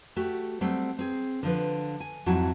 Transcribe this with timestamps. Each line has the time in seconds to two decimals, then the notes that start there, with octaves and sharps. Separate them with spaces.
0.16 A3 F#4 G4
0.61 F#3 G3 A3 C4
0.99 C4 G#4
1.43 D3 F3 B4
2.00 G#5
2.26 F2 G#2 F#3 E4 F#4 A5